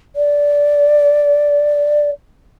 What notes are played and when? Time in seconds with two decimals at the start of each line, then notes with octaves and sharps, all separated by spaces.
0.16 D5